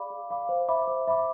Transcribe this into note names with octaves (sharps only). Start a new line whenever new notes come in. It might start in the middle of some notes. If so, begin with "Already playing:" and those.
Already playing: G#4 D5 F5 B5 D6
G#4
D5 F5 B5 D6
C5
E5 B5 D6
C5
E5 B5 D6